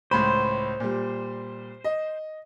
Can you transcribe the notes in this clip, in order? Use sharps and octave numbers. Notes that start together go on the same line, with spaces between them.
C#2 A2 C5 B5
A#2 G3
D#5